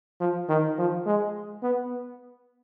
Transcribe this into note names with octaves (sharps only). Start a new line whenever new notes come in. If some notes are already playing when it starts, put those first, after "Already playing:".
F3
D#3
F3
G#3
B3